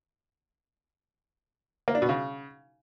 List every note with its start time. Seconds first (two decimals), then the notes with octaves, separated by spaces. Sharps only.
1.88 A#3
1.95 D4
2.02 B2
2.09 C#3